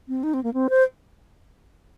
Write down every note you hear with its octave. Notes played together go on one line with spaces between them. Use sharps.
C4
D#4
C4
A#3
C4
C5